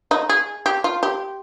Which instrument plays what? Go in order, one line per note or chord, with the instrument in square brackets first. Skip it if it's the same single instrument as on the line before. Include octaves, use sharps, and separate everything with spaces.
[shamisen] D#4
G#4
G4
F4
G4